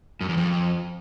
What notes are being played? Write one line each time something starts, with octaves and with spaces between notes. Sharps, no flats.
F#2
E2
F2